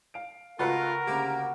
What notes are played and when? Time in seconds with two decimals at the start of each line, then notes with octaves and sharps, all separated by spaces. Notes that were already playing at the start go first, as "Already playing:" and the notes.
0.14 F5 D7
0.59 C#2 A3 F4 F#4 A#4 B4 C#7
1.07 D2 C#3 A#3 G4